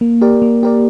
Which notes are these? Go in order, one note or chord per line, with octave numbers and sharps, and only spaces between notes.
A#3
G4 A#4 D5
A#3
G4 A#4 D5